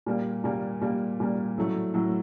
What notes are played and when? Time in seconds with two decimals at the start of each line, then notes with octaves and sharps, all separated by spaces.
0.06 A#2 G3 A#3
0.44 A#2 G3 A#3
0.81 A#2 G3 A#3
1.20 A#2 G3 A#3
1.57 A2 F#3 A3
1.94 A2 F#3 A3